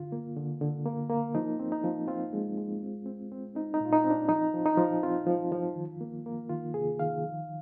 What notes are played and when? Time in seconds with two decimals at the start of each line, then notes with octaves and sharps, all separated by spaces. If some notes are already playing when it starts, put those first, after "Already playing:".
Already playing: D3 F4
0.12 A#3
0.36 D3
0.61 D3
0.86 A#3
1.10 A#3
1.35 F3 D#4
1.60 C4
1.72 D#4
1.84 F3
2.08 C4 F4
2.33 G#3
2.58 G#3
2.83 C4
3.06 C4
3.32 C4
3.55 C4 D#4
3.74 D#4
3.80 A#2 F4
3.92 D#4
4.04 C4
4.11 D4
4.29 F3 D#4
4.54 F3
4.66 D#4
4.78 F3
5.03 C4 F4
5.27 F3
5.52 F3
5.76 D#3
6.01 A#3
6.26 A#3
6.50 D#3 F4
6.74 C3 G#4
6.99 D#3 F5
7.24 F3